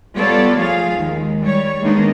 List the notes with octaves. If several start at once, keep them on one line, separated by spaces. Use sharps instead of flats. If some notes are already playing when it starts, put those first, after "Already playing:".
G3 B3 F4 A4 C#5 D5
F3 A3 F4 G#4 F5
D#2 D#3 G#3
G3 C#5
D#3 G#3 A#3 B3 D4 D#4